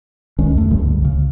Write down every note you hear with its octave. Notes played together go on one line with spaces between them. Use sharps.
C#2 D#3 G#3 C#4
F2 A3
C#2 G2 D3 G3
C#2 C#3